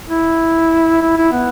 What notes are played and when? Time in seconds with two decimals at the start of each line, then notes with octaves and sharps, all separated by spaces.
0.09 E4
1.01 E4
1.17 E4
1.32 B3